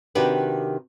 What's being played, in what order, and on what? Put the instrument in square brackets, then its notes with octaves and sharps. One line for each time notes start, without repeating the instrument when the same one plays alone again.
[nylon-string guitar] C3 D#3 D4 F#4 G4 B4